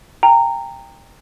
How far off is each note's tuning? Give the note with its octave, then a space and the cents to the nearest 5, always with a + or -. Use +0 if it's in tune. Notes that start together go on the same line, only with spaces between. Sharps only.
G5 +20 A#5 -15